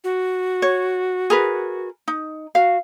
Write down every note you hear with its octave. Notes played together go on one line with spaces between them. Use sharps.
F#4
C#5
G#4 A#4 B4
D#4
F#4 F5